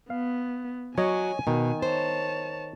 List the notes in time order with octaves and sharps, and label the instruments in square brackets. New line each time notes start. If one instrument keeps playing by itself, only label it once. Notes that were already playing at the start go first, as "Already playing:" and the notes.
[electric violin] B3 [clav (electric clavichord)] F5
[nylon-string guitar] F#3 [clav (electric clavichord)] C#5 D#5 [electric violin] G#5
[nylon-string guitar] B2 [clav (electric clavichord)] D#3
[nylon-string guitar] C5 [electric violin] C#5 A5